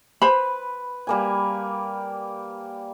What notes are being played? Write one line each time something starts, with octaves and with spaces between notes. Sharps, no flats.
B4 C5 B5
G3 A#3 G#5